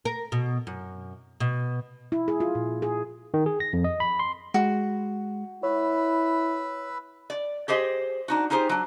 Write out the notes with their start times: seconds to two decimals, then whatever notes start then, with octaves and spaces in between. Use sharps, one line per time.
0.05 A#4
0.32 B2
0.67 F#2
1.40 B2
2.12 E4
2.28 G#4
2.40 F4
2.55 A#2
2.82 G#4
3.34 D#3
3.46 G#4
3.60 A#6
3.73 F2
3.84 D#5
4.00 B5
4.19 C6
4.54 G#3 F#4
5.63 E4 B4 C#5 B5 E6
7.30 D5
7.68 G4 G#4 C5 D#5
8.28 D4 D#4 F#4
8.50 D#4 F4 G4 G#4 C5
8.69 F#3 D4